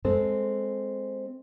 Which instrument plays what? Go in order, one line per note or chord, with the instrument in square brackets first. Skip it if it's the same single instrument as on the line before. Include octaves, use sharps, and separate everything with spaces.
[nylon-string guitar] G#3 C4 A4 C5